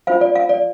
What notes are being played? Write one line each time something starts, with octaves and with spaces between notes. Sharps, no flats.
F4 C5 F5
D5
F5
D5